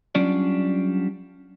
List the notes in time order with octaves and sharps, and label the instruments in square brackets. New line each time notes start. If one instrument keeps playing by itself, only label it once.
[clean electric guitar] F#3 G3 C#4 D4 F4 D5